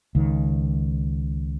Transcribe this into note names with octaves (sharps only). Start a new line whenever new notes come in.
C#2 D#3